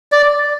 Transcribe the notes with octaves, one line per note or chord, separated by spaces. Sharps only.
D5